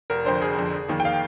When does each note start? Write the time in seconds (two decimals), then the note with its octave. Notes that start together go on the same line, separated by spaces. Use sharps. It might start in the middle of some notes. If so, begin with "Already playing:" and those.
0.10 F1 A#4
0.25 F2 D3 C5
0.41 F1 G#4
0.57 F2 D3
0.73 F1
0.88 F2 D#3 A#3
1.00 G5
1.05 F5